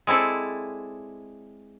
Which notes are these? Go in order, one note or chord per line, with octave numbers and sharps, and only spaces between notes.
G#3 C4 E4 A4 D5